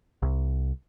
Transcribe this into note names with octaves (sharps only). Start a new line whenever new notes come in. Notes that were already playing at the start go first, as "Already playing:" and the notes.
C2